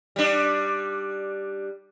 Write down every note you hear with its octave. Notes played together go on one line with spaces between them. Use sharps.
G3 D4